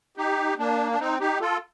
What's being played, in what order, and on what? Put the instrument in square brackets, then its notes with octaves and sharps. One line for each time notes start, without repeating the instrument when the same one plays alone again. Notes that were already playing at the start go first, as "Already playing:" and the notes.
[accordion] D#4 G4
A#3 D4
D4
C4 D#4
D#4 G4
F4 A4